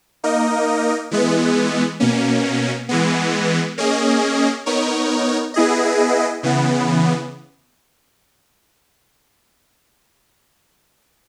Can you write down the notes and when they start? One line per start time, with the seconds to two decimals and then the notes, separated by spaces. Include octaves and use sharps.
0.24 A#3 D#4 A#4 D#5
1.11 E3 G#3 B3
2.00 B2 A#3 C#4
2.89 E3 G#3 B3
3.78 A#3 C#4 G#4 D#5
4.66 B3 D#4 A#4 C#5
5.54 B3 E4 G#4 D#5
6.43 C#3 E3 B3